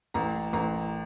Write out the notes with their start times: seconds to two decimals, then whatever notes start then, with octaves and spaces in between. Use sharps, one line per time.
0.14 A1 A#5
0.53 A1 A#5